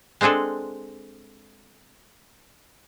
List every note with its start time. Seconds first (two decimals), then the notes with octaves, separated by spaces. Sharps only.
0.21 G#3 C4 D4 G#4 A4